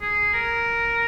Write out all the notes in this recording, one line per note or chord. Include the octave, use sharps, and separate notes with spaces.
G#4
A#4